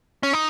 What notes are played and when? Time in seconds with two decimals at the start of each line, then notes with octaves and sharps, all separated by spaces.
0.23 C#4
0.33 D#4